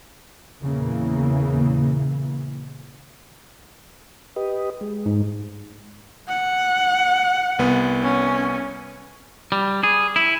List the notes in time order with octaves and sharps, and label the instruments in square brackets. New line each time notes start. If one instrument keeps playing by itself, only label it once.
[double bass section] E2 A#2 C#3 E3 A#3
[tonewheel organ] G4 B4 D#5
G#3
[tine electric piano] G#2
[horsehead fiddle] F#5
[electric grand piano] C2 B3
[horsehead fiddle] C#4
[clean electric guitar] G3
G#4
E4